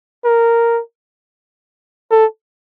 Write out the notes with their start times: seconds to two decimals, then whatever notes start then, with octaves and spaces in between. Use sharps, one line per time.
0.24 A#4
2.11 A4